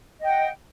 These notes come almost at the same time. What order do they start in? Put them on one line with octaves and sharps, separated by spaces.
D#5 G5 F#5